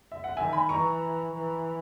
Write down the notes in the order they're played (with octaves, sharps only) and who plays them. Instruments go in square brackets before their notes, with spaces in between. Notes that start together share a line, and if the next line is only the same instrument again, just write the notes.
[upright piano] E5
F#5
[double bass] D#3 [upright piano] E5 G#5
[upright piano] G#5 B5
[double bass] E3 [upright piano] A#5 C#6
[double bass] E3